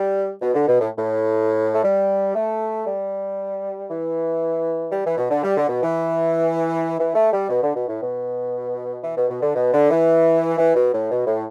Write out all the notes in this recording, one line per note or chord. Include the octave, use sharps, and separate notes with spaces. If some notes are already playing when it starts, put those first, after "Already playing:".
Already playing: G3
B2
D3
B2
A2
A2
A3
G3
A3
G3
E3
G3
E3
B2
D3
G3
D3
B2
E3
E3
A3
G3
B2
D3
B2
A2
B2
E3
B2
B2
D3
B2
D3
E3
E3
B2
A2
B2
A2